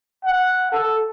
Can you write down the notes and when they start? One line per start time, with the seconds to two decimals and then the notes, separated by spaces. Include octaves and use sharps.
0.25 F#5
0.72 A4